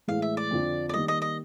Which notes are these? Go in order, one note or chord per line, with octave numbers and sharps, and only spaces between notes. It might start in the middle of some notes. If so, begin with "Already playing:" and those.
A2 E3 G#3 F5
E5
D5
F2 D3 F3
D5
D#3 G3 A#3 D#5
D#5
D#5